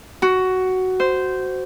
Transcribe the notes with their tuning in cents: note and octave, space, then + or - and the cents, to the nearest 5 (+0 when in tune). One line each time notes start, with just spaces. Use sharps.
F#4 +10
C5 -10